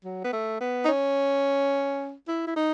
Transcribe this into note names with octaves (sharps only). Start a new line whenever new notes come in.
F#3
B3
A3
B3
D#4
C#4
E4
E4
D#4